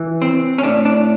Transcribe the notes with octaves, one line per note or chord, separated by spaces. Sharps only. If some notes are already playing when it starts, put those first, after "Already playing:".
Already playing: E3
C4
C#4
A2 D4
D4